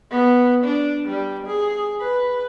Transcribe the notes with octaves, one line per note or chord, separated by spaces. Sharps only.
B3
D4
G3
G#4
B4